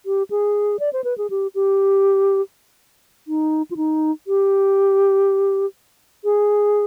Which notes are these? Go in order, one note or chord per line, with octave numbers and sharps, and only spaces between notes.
G4
G#4
D5
C5
B4
G#4
G4
G4
D#4
F4
D#4
G4
G#4